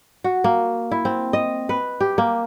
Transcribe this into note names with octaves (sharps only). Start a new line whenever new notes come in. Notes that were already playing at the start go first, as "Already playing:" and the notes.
F#4
A#3
E4
C4
D#5
B4
G4
A#3